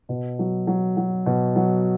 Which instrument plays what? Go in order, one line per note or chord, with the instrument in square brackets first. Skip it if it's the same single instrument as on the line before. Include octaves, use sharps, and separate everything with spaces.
[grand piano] B2
F#3
F#3
F#3
B2
F#3